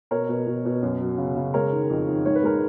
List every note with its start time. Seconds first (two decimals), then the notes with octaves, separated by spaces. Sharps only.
0.11 B2 A#4 C#5
0.29 B2
0.47 B2
0.65 B2
0.82 F#2
1.00 F#3
1.18 C#3
1.36 C#3
1.54 G#3 A#4 C#5
1.72 D#3
1.90 F2
2.08 D#3
2.26 G#2 C#5
2.36 B4
2.43 G#3 A#4